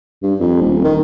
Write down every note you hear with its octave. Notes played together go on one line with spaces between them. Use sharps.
G2
F2
D#1
D#3